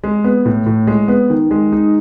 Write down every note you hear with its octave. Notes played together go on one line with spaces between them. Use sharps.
G#3
B3
A2
A2
G#3
B3
D#3
G#3
D#4